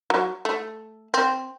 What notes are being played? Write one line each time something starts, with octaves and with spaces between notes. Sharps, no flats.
F#3
A3
C4